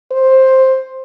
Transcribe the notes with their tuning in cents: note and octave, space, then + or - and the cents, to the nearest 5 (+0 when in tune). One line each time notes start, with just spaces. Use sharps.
C5 +10